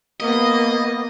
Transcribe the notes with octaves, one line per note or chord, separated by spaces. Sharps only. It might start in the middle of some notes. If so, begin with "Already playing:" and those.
A#3 B3 D#5